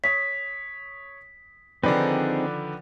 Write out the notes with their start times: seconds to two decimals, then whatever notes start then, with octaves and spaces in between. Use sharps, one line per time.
0.04 C#5 D#6 B6
1.83 D3 D#3 F3 C4 D#4 G#4 B4 D5